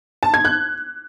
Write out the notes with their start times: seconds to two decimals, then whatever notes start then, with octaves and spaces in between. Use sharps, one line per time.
0.23 A5
0.34 G#6
0.45 F#6